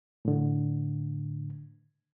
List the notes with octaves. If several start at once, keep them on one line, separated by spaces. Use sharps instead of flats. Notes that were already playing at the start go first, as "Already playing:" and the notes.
A2 D3